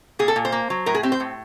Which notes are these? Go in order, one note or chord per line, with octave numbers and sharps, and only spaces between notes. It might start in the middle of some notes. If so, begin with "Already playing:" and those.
A#2 G#4
A4
A#2
C5
A#3
F#3
A2 A#4
G#4
C4 G4
C5
A2